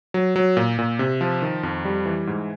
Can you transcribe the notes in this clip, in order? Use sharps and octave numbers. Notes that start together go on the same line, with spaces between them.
F#3
F#3
A#2
A#2
C3
F3
D#3
F2
G3
E3
G#2